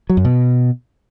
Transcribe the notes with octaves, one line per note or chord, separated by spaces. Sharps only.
F#3
F#2
B2